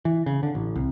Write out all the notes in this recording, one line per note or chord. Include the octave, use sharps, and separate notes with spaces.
E3
C#3
D3
A1
C2